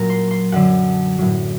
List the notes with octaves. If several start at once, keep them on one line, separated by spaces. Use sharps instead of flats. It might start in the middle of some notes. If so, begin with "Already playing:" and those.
Already playing: A#2 F#3 A#5
C6
C6
F#2 D3 F#3 F#5
A2 F#3